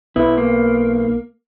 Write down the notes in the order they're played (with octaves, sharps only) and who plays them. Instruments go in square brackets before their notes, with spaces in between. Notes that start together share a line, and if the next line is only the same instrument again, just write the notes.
[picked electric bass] B1 B3 [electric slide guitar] E4
[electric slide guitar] A#3